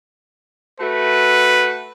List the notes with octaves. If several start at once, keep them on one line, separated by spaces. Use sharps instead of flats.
A3 F#4 B4